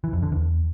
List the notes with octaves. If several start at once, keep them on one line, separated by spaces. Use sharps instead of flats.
E3
F2
D3
E2